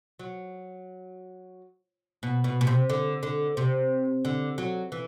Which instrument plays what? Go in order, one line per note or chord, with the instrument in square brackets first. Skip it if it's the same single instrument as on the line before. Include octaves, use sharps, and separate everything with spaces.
[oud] F#3
B2
B2
B2
C3
D3
D3
C3
D3
F#3
E3